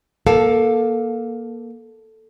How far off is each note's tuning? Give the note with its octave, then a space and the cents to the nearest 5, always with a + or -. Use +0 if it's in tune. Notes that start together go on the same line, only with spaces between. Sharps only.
A#3 +20 A4 +0 F5 +20